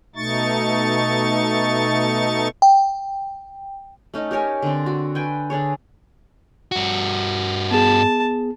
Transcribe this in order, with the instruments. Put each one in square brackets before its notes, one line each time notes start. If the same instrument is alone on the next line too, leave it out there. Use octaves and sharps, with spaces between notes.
[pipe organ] B2 A3 D#4 C#6 A6
[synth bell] G5
[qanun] A3 C#4 D#4
G4 A#4 C#5 G#5
D3 C4
F#4
B4 G5 G#5
D3 D4 G#4 C#5
[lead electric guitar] G2 F#4
[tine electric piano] B3 G#4 [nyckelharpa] A5